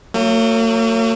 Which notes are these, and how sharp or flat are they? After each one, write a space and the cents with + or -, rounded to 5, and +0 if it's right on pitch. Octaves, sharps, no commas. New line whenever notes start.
F#3 +0 A#3 -45